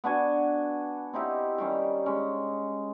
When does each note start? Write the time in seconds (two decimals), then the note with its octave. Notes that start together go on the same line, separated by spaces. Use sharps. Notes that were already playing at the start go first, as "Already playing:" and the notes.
0.04 B3 D4 F#4 G#5
1.13 C4 D#4 E4 G4
1.58 D#3 G3 C#4
2.06 G#3 C#4